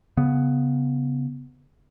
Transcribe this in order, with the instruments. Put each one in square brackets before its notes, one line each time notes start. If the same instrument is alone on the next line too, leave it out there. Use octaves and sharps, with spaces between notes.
[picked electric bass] C#3 B3